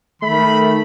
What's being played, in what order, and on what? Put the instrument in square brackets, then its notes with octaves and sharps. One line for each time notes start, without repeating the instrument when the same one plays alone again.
[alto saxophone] D#3 [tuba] A3 [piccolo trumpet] B5